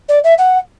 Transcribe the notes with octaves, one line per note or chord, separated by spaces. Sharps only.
D5
E5
F#5